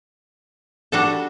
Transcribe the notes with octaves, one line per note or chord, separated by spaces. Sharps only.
G3 D4 F#4 A4